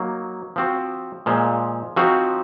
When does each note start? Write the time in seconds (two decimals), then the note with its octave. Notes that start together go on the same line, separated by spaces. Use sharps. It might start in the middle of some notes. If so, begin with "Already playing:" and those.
Already playing: F#3 A#3 D#4
0.56 F3 C4 F#4
1.26 A#2 F3 G#3
1.96 F3 C4 D#4 F#4